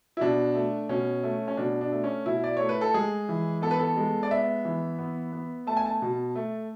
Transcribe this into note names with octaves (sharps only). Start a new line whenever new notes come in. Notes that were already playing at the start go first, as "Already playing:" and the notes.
E4
B2 D4
A3
B2 C#4
A3
C#4
B2 D4
D4
A3
C#4
B2 E4
D5
A3 C#5
B4
A4
G#3 G#4
E3
B3 A4
B4
A4
G#3
D5
B3 E5
E3
B3
B3
A3 A5
G#5
A5
B2
A3